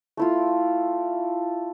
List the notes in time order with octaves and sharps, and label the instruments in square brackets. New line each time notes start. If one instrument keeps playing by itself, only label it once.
[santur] A3 E4 F4